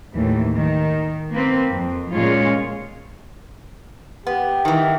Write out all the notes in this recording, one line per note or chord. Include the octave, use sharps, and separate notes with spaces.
D#2 A2 E3
D#3
A#3 C4 B4
F2
A#2 G#3 C#4 F4 C#5
B3 G4
D#3 E3